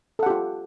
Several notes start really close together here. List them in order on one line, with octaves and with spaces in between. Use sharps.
A4 F#5 G4 F4